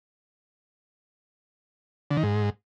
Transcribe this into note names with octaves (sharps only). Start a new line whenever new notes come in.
D3
D#3
G#2